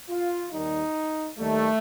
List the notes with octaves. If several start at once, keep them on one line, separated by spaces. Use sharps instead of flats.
F4
D#2 D#3 G3 D#4
D#2 D#3 G3 A3